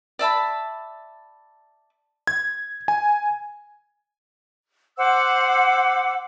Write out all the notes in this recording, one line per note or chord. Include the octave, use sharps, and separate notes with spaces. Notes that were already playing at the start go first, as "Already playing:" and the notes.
D5 E5 A5 B5
G#6
G#5
C5 F#5 D6 E6